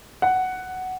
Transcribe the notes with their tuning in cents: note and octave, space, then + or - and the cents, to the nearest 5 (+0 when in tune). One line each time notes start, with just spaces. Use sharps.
F#5 +5